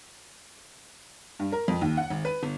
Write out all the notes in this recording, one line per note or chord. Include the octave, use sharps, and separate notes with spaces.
G2
A#4
F2
D#2
F#5
G#1
B4
G1